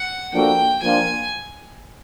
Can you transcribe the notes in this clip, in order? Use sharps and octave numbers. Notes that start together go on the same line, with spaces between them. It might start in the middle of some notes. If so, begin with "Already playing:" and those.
Already playing: F#5
F3 A#3 D4 F#4 A4 G5
F3 A#3 D4 F4 G#5